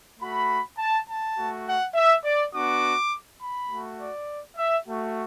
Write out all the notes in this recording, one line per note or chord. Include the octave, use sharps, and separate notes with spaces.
A3 F#4 B5
A5
A5
A3 F#4
F#5
E5
D5
B3 D4 F#4 D6
B5
A3 F#4
D5
E5
A3 F#4